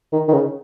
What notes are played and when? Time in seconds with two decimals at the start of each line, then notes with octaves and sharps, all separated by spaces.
0.13 D#3
0.29 D#3
0.33 C#3